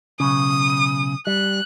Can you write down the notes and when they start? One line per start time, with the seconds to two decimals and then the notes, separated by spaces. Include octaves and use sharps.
0.20 B1 C#3 D#6
1.27 G3 F#6